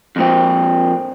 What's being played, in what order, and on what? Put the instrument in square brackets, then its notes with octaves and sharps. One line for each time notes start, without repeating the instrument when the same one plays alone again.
[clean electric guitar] F2 A#2 C4